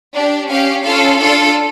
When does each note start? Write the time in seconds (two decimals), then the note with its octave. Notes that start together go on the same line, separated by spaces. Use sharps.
0.13 D4 G4
0.49 C#4 G4 F5
0.84 C#4 F4 A4 F5
1.19 D4 F4 A4